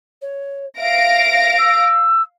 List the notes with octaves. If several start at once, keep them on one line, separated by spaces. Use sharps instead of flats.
C#5
E5 F5 A#6 D7
E6